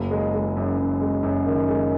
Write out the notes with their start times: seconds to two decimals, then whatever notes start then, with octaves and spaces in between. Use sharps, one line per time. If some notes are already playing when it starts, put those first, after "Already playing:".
Already playing: F#1
0.11 G#3
0.34 G#3
0.57 F#2
0.78 F#2
1.01 G#3
1.23 F#2
1.46 D#3
1.68 G#3